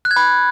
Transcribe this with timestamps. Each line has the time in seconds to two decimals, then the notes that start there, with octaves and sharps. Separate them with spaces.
0.05 F#6
0.11 G#6
0.16 B5